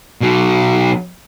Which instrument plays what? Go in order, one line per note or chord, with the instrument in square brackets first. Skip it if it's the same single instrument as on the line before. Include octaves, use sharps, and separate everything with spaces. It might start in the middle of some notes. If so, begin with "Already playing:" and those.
[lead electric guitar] B2 F#3